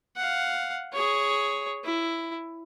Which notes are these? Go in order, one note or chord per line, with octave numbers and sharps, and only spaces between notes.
F5 F#5
G#4 C#5
E4